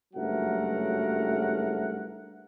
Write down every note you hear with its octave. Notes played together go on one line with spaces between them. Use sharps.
F#1 G2 F#3 A3 A#4 F#5